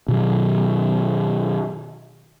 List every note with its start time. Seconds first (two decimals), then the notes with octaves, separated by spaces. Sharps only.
0.08 B2 D#3 F#3